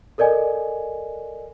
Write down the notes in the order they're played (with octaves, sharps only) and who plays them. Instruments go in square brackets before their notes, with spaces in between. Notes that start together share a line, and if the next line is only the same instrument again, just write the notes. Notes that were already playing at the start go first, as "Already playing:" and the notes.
[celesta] A4 A#4 D5 D#5 G#5